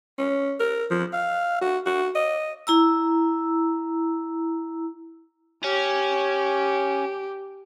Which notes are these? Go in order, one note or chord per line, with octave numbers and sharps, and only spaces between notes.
C#4
A#4
F3
F5
F#4
F#4
D#5
E4 A#5 E6
C#4 G4